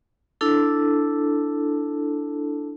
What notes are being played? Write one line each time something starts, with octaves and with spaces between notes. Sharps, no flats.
D4 E4 A4 A5